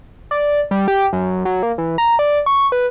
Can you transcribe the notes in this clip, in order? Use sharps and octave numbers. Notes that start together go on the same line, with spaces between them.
D5
G3
G4
F#2
F#3
A#3
E3
A#5
D5
C#6
B4